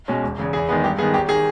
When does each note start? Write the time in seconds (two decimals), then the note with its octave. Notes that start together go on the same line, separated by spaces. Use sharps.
0.08 B2 G#3 C#4
0.23 E1
0.38 E2 C#3
0.53 E2 G#4
0.69 D#3 G#3 B3
0.84 G2 G4
0.98 D#3 G#3 B3 G#4
1.14 G#1 G4
1.29 D#3 G#4